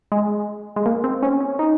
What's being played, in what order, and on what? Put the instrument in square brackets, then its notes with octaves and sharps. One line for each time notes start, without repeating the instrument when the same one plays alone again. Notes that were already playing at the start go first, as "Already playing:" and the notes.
[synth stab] G#3
G#3
A#3
C4
C#4
C#4
D#4